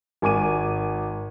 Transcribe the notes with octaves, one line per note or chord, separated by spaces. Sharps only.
G#1 G#5 D6 D#7